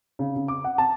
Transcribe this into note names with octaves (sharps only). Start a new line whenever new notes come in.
C#3
C#3
D6
F#5
A5